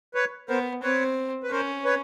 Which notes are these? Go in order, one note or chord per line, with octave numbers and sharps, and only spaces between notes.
B4 C#5
B3 A#4 C5
C4 B4 C#5
B4
C#4 A#4 C5
B4 C#5